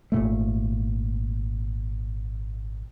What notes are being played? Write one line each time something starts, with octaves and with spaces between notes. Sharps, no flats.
G#1 A#2 A3